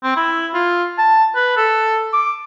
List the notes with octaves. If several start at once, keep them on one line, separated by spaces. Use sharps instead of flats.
C4
E4
F4
A5
B4
A4
D6